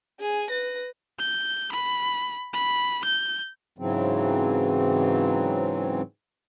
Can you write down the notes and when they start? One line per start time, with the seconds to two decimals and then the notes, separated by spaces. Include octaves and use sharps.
0.20 G#4 G#5
0.50 B4 A#6
1.19 G6
1.72 B5
2.53 B5
3.04 G6
3.78 G#2 C#3 E3 F#3 C4